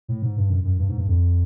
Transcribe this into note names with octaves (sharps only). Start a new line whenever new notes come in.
A2
G#2
G2
F#2
F#2
G2
G#2
G2
F2